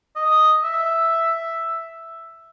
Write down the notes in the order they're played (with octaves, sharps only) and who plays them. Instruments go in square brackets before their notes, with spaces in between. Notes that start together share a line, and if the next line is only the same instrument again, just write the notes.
[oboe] D#5
E5